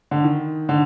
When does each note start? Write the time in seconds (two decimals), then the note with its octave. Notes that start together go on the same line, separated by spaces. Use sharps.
0.11 D3
0.24 D#3
0.69 D3